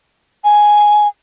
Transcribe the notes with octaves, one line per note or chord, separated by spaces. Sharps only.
G#5